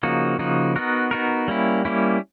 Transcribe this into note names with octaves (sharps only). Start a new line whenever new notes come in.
C#3 F3 A#3 D#4 F#4
C#3 F3 A#3 D#4 F#4
B3 D#4 F#4 A#4
B3 D#4 F#4 A#4
G3 A#3 C#4 E4
G3 A#3 C#4 E4